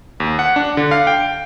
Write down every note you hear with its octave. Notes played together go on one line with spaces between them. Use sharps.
D#2
F#5
D4
D3
F5
G5